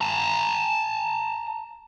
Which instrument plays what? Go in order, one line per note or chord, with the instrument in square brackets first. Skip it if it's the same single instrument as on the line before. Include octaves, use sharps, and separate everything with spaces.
[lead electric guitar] A5 A#5